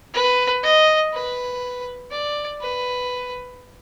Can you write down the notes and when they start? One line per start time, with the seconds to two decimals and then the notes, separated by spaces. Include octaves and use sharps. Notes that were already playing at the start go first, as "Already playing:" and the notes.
0.14 B4
0.63 D#5
1.13 B4
2.11 D5
2.61 B4